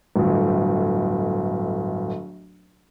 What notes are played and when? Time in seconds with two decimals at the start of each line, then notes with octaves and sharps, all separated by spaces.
0.16 D1 G1